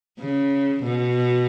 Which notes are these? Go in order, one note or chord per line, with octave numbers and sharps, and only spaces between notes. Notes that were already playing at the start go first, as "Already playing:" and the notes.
C#3
B2